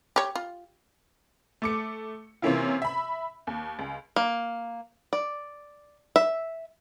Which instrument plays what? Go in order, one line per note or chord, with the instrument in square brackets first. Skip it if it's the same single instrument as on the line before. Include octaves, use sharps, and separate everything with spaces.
[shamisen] G4 C#5
F4
[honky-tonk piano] A3 D6 C#7
C3 E3 A#3 C#4 E4 F4
E5 B5
D#2
C#2
[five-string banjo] A#3
D5
E5